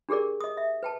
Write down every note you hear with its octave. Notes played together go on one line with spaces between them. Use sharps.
D4 G4 G#4 A#4 D5
D#5 D#6
E5
B4 G5 A5